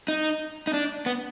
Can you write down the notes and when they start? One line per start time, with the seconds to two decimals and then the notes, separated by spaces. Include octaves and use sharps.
0.08 D#4
0.67 D#4
0.73 D4
1.06 B3